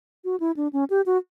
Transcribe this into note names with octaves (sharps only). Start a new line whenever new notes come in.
F#4
E4
D4
C#4
G4
F#4